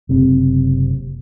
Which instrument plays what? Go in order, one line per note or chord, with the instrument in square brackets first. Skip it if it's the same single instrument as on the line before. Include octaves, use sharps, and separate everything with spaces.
[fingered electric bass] F#1 C3 C4